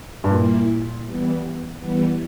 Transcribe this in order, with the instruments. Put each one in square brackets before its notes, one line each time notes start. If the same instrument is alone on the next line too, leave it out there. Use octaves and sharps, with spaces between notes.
[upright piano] G2
[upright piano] A#2 [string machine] G3 A#3 E4
[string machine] E3 G3 B3
E3 G3 B3